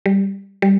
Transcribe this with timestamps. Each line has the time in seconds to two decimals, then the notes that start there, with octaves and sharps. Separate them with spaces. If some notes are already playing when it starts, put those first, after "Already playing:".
0.06 G3
0.62 G3